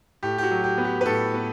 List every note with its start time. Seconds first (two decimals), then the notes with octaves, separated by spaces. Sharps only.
0.23 A2 G4
0.38 G4
0.43 F#4
0.51 F#3
0.64 G4
0.78 B3
0.85 G4
1.01 B4
1.05 A2 A4
1.34 B3